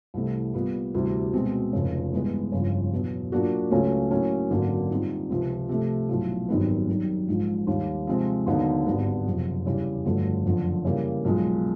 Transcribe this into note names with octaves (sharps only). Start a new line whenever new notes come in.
C2 C3 E3 A3
A#2 G3 B3
D2 C3 E3 G3
B2 G#3 C4
F1 F2 C#3
G2 E3 G#3 B3
G1 F2 C#3 E3
E2 B2 F#3
A#2 F#3 A#3 D4 F#4
C#2 C#3 F#3 A3 C#4
A2 F#3 A#3 C#4
G#1 F#2 D3 F#3 A#3
A#2 G3 C4 D#4
C#2 C3 F3
C3 F3 A3
B1 A2 F3
G#1 F#2 D#3 G3 B3
F#2 D#3 G3
A#1 G#2 F3 G#3
D#2 D#3 G3
C3 F3 G#3 C4
D#2 D3 F#3 B3 D#4
G#1 G2 D3 G3 B3
F#1 F2 C3
E2 C#3 E3 G3
G1 F2 D3 F#3 A3
F#1 F2 D3 F3
C#3 E3 G3 A#3
B1 A#2 F3 G#3